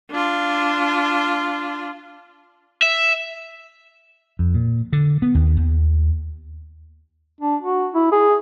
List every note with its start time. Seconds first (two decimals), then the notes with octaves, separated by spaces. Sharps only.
0.11 D4 F4
2.82 E5
4.39 F2
4.55 A#2
4.93 D3
5.22 B3
5.35 D#2
5.57 D#2
7.41 D4
7.62 F#4
7.95 E4
8.12 G#4